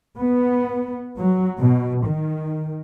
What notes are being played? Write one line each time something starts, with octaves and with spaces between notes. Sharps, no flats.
B3
F#3
B2
D#3